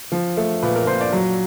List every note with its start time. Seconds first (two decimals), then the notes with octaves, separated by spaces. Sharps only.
0.12 F3
0.37 A3
0.62 A#2 B4
0.75 A#4
0.87 A#2 C5
1.01 D5
1.13 F#3